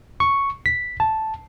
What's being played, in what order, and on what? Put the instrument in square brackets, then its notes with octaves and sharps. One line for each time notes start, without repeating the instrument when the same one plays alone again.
[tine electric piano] C#6
B6
A5